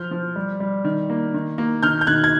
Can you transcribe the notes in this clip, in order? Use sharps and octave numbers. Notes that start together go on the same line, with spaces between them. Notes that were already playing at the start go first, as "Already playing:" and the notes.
Already playing: F3 F6 G6
F3
G3
G3
D#3
A#3
D#3
A#3
D#3 F6 G6
G6
D#3 F#6 G#6
G#6